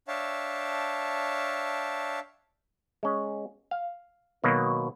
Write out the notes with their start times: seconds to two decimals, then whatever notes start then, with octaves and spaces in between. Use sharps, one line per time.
0.08 D4 C#5 E5 F5 G5 A5
3.03 G#3 C#4
3.71 F5
4.44 B2 D#3 F#3 A#3